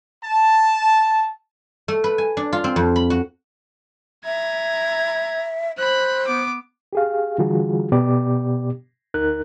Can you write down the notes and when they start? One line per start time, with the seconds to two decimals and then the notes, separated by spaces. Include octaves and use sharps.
0.24 A5
1.88 A3
2.04 B4
2.18 G#5
2.37 D4
2.53 F4
2.64 C4
2.76 F2
2.96 B5
3.10 F#4
4.25 E5 A#5 G#6
5.78 C5 B5 F#6
6.27 B3 D6
6.93 G4 G#4 F5
7.38 D3 E3 G3 F4 F#4 G#4
7.92 B2 B3 G4 D5 D6
9.14 D2 D#4 A#4 F#6